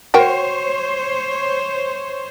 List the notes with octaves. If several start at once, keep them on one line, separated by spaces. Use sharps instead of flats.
F#4 A#4 C5 C#5 G5